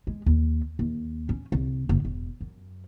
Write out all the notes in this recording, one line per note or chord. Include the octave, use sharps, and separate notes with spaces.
G#3
D#2
D#2
C#4
C2
F#1
E1
F#2